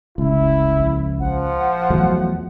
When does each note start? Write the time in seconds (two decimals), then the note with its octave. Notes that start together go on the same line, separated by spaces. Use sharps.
0.18 F1 C#2 E4
0.79 A#1
1.20 A#1 F3 F#5
1.90 E2 F#3 A3